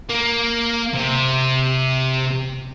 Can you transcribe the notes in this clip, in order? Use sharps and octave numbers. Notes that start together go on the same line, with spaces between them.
A#3
C3